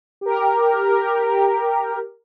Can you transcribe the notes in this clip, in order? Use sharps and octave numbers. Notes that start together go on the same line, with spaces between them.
G4 A#4